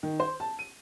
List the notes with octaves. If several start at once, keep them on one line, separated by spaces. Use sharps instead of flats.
D#3
C5
A5
D#7